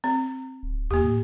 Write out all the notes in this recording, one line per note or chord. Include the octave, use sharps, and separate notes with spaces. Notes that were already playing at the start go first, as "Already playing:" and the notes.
C4
D1
D#2 A#3 G4
A2